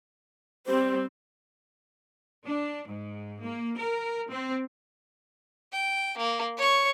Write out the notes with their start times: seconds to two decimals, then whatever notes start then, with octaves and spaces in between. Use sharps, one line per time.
0.66 G3 C4 G4 C5
2.45 D4
2.88 G#2
3.41 A#3
3.79 A#4
4.29 C4
5.72 G5
6.18 A#3
6.57 C#5 C#6